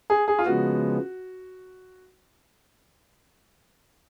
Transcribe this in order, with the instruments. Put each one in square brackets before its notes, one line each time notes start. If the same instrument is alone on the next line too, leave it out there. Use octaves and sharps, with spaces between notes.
[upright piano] G#4
G#4
F4
[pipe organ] C#3 F3 G#3 B3 [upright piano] F#4